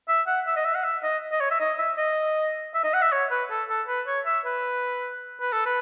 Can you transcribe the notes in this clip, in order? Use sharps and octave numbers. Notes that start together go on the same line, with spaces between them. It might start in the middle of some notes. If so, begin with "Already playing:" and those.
E5
F#5
E5
D#5
E5
F#5
E5
D#5
D#5
C#5
E5
D#5
E5
D#5
E5
D#5
F#5
E5
C#5
B4
A4
A4
B4
C#5
E5
B4
B4
A4
B4